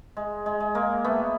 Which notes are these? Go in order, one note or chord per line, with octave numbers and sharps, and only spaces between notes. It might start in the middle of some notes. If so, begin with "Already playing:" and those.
G#3
G#3
G#3
G#3 A#3
A3 B3